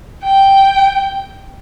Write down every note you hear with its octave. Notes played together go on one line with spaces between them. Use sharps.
G5